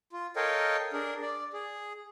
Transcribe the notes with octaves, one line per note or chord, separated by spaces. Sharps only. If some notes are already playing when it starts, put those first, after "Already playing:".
F4
A4 A#4 C#5 D#5 F5 G5
D4 G#4 A#4
D5
G#4